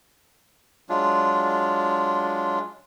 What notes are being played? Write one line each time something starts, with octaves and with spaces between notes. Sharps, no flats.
F#3 G#3 D4 F4